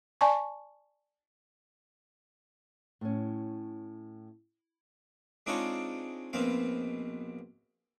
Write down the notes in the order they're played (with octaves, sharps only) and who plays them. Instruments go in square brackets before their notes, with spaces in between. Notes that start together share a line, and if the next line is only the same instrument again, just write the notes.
[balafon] D5 G#5 A5 C#6
[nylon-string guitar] A2 C#4
[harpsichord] G#3 C4 D4 D#4 F4 C#5
A#1 B2 C4 F5